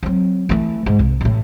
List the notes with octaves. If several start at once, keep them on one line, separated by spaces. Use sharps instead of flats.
F#3 C4
E3 A3
G#2
C2
A1 A2